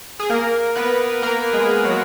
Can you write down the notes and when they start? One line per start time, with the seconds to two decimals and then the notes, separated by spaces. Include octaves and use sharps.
0.20 G#4
0.30 A#3 A#4
0.76 B3 B4
1.22 A#3 A#4
1.53 G#3 G#4
1.85 F#3 F#4